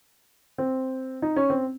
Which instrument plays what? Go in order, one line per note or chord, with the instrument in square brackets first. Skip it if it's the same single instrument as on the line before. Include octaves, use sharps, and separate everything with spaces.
[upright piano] C4
D#4
C#4
C4